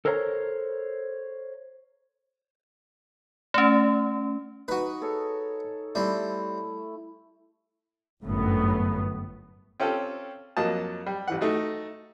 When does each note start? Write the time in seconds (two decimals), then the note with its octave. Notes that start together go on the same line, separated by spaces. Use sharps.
0.05 A4 A#4 C5 C#5 F5 A#5
3.54 A3 C#4
4.68 D#4 F#4 B4
5.01 G#4 A4 C#5
5.95 G3 A3 C4 E4
8.25 G1 F#2 A2 B3
9.80 C4 C#4 F4 G4 A4
10.57 F2 F#3 A#3 D#5 A5
11.06 G3
11.28 A1 E3 F#5
11.41 A3 D#4 F#4